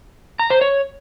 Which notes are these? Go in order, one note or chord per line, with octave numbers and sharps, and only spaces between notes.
A#5
C5
C#5